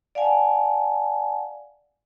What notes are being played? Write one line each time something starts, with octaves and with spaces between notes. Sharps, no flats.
D5 F5 F#5 G#5 A5